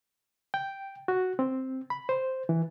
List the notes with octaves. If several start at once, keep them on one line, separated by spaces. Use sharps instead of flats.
G5
F#4
C4
B5
C5
E3